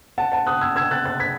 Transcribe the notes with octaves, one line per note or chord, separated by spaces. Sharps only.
F#5 A5
F#5 A5
D#6 F#6
E6 G#6
E6 G#6
F#6 A6
F#6 A6
G#6 B6